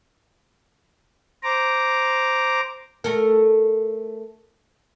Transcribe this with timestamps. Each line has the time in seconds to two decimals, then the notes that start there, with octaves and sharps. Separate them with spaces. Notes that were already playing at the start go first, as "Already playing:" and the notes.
1.43 C5 A#5 D6
3.04 A3 A4 A#4